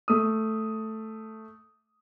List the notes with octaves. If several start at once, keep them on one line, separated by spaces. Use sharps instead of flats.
A3 D#6